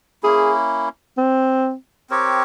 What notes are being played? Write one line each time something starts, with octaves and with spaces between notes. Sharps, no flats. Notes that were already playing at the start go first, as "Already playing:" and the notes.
A#3 C#4 E4 G#4
C4
C4 G4 A#4 C#5